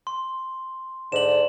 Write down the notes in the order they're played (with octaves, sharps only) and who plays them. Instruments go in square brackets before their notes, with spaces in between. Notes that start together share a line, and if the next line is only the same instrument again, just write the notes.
[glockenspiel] C6
[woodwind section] G#2 D3 [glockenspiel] E7 F#7